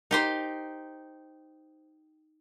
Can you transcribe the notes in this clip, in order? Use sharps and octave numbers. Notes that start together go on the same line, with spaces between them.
D#4 G4 C5